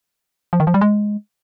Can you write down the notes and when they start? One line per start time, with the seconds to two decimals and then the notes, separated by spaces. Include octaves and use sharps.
0.53 F3
0.60 D#3
0.67 F3
0.74 G3
0.81 G#3